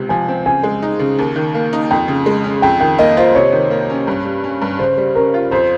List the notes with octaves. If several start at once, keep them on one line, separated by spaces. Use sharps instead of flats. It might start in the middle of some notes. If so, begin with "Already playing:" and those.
Already playing: C#2 C3
F3 G#5
C4
C#3 G#5
G#3
D#4
C#3
D#2
D#3
A#3
D#4
F2 G5
C#3
G#3
C#4
F2 G5
D#3 G5
A#3 D#5
F4 C5
C3 C#5
D#3
A#3
C#4
G2
G3
C#4
G2
C#3 C5
G3
C#4 A#4
F4
F2 C5